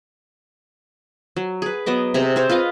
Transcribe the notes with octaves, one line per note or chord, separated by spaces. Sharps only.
F#3
G#4 B4
F#3 B3 D#5 D6
C3 G#4 A#5
C4 C5 C#5
F4 B4 D#5 F5